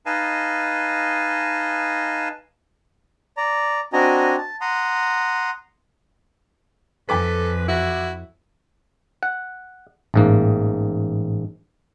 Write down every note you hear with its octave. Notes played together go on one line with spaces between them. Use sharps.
D#4 B4 D#5 F5 G#5 A5
D5 A#5
C4 D4 F#4 D#5 G#5 A#5
A5
F#5 A#5 C6 D#6
F2 A4 B4 G#5 D6 B6
E4 F#4
F#5
A1 G#2 A#3